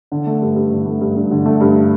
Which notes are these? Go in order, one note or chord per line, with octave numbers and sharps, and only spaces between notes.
D3
A3
G2
G2
D3
A3
G2
G2
D3
A3
G2